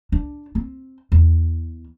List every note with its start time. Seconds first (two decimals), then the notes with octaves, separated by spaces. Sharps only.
0.12 D4
0.55 C4
1.12 E2